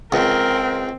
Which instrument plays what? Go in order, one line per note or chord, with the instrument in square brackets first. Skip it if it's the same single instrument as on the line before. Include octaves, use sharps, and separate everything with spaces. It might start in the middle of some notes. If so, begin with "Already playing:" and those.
[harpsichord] C#2 [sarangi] C4 [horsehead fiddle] A#4